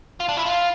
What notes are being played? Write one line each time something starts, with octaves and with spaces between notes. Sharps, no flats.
F4
D4
E4
F4